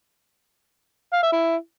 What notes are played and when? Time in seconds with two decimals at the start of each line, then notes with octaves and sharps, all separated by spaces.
1.13 F5
1.23 E5
1.33 E4